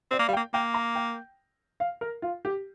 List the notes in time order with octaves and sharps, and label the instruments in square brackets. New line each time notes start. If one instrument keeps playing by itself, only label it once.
[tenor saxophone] C4 [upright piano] D5
[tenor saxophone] A#3
[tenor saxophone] G3 [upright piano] F5
[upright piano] G5
[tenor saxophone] A#3
[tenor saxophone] A#3 [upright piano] G5
[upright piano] A#5
G5
F5
A#4
F4
G4